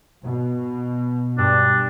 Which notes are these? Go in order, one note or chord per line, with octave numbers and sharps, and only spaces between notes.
B2
G2 D4